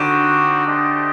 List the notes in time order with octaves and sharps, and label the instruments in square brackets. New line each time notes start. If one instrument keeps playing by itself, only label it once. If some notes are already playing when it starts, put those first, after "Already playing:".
Already playing: [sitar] D3 [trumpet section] G3 C4 D#4 F#4
[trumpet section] A3 D4 G4 C5 D#5